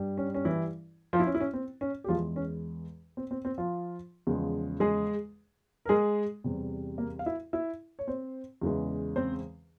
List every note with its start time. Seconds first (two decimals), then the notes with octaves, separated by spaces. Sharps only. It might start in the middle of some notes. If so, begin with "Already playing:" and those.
Already playing: G2 G3
0.18 C#4
0.34 C#4
0.45 E3 E4
1.13 F3 F4
1.20 E4
1.27 C#4
1.35 E4
1.40 C#4
1.53 C4
1.81 C#4
2.04 G4
2.08 E2 E3 F3 G#3 F4
2.36 C#4
3.17 C4
3.31 C4
3.45 C4
3.58 F3 F4
4.27 E2 C#3 F3 G#3
4.80 G#3 G#4
5.86 A#4
5.89 G#3 G#4
6.44 E2 C3 G3
6.98 A#3 A#4
7.19 F5
7.26 E4 E5
7.53 E4 E5
7.99 C#5
8.07 C4 C5
8.61 E2 C#3 E3 G#3
9.16 C4 C5